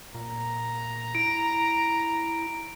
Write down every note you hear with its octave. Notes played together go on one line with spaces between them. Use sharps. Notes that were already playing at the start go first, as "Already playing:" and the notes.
A#2 A#5
E4 D7